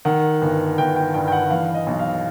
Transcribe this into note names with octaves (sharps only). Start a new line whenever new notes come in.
D#3 F#5
G1
G1 G5
G5
G2 G5
G5
F#5
E3 F5
D#5
B1
F5